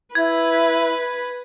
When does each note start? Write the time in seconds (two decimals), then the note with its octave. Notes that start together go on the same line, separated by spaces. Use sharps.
0.15 E4 B4 G#6